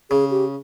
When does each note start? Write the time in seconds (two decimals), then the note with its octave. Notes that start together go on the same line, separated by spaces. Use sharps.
0.11 C#3 G#4
0.31 G4